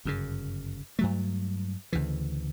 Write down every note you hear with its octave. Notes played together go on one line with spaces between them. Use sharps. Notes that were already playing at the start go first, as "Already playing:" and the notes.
G1 F#2 C#3
G2 F#3 A3
D2 C#3 E3